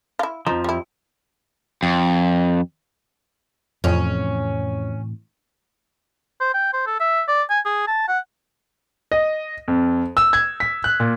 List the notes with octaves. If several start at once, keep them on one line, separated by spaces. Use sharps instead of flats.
E4 F4
F2 F3 D#4
G3 E4
F2
F2 A2 C3 E3 C#4
C5
G5
C5
A4
E5
D5
G#5
G#4
A5
F#5
D#5
F2
E6
G#6
B6
F#6
A#2